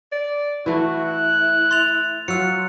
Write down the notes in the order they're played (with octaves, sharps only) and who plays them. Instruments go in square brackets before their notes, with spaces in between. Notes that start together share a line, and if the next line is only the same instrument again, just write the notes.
[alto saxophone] D5
[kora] E3 A3 [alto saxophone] E4 [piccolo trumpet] F#4
[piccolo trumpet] F#6
[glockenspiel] C6 A6 F7
[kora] F#3 [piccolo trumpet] F4 [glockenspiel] E6 F#6 C#7